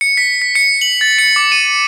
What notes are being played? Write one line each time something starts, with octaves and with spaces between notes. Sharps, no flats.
C#7
B6
B6
C#7
F#7
A6
C#7
D6
D#7